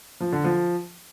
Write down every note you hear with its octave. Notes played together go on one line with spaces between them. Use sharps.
F3
D3
F3